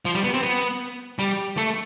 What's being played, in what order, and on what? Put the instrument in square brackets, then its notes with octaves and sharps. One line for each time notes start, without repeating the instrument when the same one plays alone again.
[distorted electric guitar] F3
G3
B3
C4
B3
G3
A3